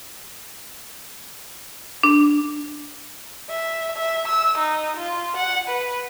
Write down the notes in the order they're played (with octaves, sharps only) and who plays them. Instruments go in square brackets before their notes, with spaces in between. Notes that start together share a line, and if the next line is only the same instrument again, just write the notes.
[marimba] D4
[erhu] E5
E5
E6
D#4
F4
F#5
B4